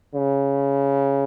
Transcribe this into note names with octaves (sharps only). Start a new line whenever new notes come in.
C#3